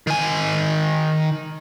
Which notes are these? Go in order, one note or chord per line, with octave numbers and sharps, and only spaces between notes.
D#3 G#5